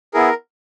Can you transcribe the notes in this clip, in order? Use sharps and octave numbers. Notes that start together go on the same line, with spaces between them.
B3 E4 G#4 A#4